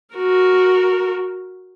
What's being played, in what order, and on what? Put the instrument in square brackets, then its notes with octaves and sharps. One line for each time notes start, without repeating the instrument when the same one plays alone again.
[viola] F#4 A#4